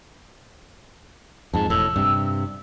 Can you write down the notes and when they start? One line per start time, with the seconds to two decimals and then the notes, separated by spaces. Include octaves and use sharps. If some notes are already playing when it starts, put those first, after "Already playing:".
1.54 F2 G#2 A5
1.70 E1 A2 E6
1.96 G2 C3